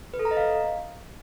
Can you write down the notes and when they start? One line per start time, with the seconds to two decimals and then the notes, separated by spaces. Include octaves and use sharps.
0.14 B4
0.19 A4
0.25 A#5
0.31 D#5
0.37 F5